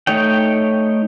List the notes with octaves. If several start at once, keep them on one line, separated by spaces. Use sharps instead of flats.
A3 D#4 C#5 G5